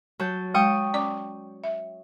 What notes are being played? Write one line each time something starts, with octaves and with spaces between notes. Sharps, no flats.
F#3 A5 G6
G#3 G5 C#6 D#6
C#4 D5 D6
E5